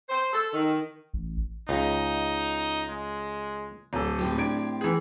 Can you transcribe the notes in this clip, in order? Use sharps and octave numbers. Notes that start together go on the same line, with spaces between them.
C5
A4
D#3
A1
C#2 D#4
G#3
D1 A4
A2 C4 G4
D4 G#6 D7
E3 G#4